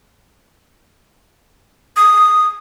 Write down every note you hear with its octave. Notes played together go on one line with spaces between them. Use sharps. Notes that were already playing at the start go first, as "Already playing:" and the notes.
D#6